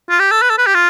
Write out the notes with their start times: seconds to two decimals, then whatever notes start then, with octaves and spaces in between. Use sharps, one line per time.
0.10 F4
0.20 G4
0.32 A4
0.42 B4
0.50 A4
0.58 B4
0.67 G4
0.75 F4